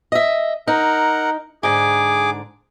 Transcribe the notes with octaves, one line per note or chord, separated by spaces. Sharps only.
D#5 E5
D#4 A#4 F#5
G#2 D3 G#4 D6